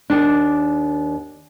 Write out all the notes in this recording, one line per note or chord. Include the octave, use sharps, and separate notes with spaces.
D#2 D4